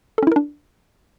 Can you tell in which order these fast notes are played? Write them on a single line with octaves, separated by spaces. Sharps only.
A4 C#4 E4 A#4 D4